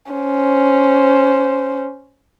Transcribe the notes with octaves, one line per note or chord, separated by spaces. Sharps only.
C#4 C5